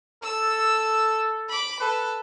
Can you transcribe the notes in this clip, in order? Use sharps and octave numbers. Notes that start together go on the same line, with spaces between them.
A4 E6
B5 D6
A4 B4